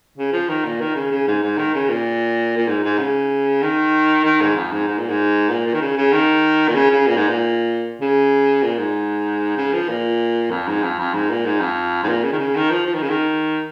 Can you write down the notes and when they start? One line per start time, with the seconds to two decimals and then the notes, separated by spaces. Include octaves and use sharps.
0.18 C#3
0.33 F3
0.49 D#3
0.64 A#2
0.80 D#3
0.95 C#3
1.11 C#3
1.27 G#2
1.43 G#2
1.58 D#3
1.75 C#3
1.89 A#2
2.57 A#2
2.68 G#2
2.84 G#2
2.99 C#3
3.62 D#3
4.25 D#3
4.41 G#2
4.56 F2
4.72 G#2
4.88 G#2
4.98 A#2
5.09 G#2
5.49 A#2
5.66 A#2
5.74 D#3
5.81 C#3
5.98 C#3
6.12 D#3
6.68 A#2
6.75 C#3
6.91 C#3
7.07 A#2
7.17 G#2
7.28 A#2
8.01 C#3
8.63 A#2
8.78 G#2
9.57 C#3
9.73 F3
9.89 A#2
10.51 F2
10.67 G#2
10.83 F2
10.99 F2
11.14 G#2
11.30 A#2
11.45 G#2
11.60 F2
12.03 G#2
12.08 A#2
12.23 C#3
12.32 D#3
12.39 C#3
12.55 D#3
12.71 F3
12.86 F3
12.94 D#3
13.02 C#3
13.09 D#3